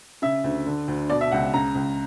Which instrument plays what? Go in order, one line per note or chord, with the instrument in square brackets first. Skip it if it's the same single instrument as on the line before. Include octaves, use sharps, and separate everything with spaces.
[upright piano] C#3 E5
D2
D3
D2
B2 D5
E5
C#2 F#5
C#3 A#5
C#2